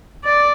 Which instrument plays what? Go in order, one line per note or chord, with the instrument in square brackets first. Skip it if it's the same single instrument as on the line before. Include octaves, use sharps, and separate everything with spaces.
[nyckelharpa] D5